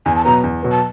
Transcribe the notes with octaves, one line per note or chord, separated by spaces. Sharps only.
E2 G#5
A5
B2 F#3 B3 A#5
E2
B2 F#3 B3
A5